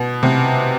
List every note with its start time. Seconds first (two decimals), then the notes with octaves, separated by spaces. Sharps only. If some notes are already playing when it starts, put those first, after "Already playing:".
Already playing: B2
0.23 C3